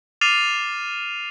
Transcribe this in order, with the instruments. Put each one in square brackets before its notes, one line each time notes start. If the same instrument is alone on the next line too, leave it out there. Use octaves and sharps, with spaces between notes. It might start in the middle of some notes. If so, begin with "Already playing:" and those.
[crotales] D6 F6 A6 C7 D#7 F7